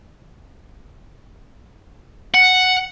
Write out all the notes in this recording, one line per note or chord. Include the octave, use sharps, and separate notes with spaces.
F#5